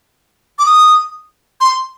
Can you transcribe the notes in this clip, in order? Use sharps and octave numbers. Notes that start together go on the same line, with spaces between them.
D6
D#6
C6